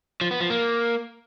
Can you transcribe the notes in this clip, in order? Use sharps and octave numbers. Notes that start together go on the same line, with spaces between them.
F3
B3
F3
A#3